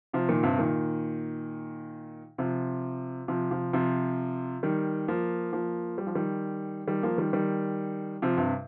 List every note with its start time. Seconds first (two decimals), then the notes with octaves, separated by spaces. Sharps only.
0.13 C3 F3
0.29 A#2 D#3
0.43 G2 C3
0.58 A#2 D#3
2.38 C3 F3
3.28 C3 F3
3.51 C3 F3
3.73 C3 F3
4.63 D#3 G3
5.08 F3 A#3
5.53 F3 A#3
5.98 G3
6.07 F3
6.15 D#3 G3
6.87 D#3 G3
7.03 F3 A#3
7.17 D#3 G3
7.33 D#3 G3
8.22 C3 F3
8.37 G2 C3